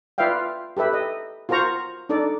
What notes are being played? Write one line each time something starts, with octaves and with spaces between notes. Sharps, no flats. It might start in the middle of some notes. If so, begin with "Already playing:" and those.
F4 B4 D5 E5 F5 G5
G4 A4 B4 E5
D#5
F4 F#4 A#4 C5 A#5 C#6
D4 D#4 A4 D5